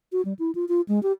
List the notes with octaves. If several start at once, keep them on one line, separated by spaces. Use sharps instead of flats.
F#4
G3
E4
F4
F4
G#3
G4